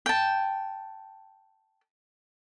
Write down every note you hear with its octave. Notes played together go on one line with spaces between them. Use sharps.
G5 A5